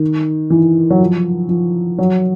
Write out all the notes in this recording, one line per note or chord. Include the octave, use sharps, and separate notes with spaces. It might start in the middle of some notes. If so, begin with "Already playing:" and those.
Already playing: D#3
E3
F#3
F3
F3
F#3